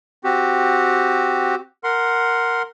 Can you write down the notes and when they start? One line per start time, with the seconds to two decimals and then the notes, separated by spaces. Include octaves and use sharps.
0.24 C4 F#4 G4
1.84 A#4 F#5 C6